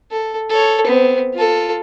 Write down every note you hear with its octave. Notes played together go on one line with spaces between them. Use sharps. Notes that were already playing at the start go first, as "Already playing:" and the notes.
A4
A4 C#5
B3 C4
F4 A4